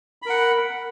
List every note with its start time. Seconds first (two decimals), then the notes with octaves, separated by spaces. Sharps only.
0.22 B5
0.26 A#4
0.30 F#5